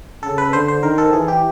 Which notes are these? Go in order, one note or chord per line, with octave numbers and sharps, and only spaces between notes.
C#3 A4
B4
D3 C5
C5
D#3 A#4
A4
E3 G#4
G4